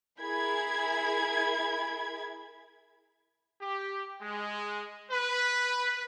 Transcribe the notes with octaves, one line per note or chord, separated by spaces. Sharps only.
E4 G#4 A#4 B5 G#6
G4
G#3
B4